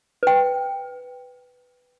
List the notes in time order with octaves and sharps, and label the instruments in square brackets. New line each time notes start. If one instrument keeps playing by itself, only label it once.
[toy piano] B4 G5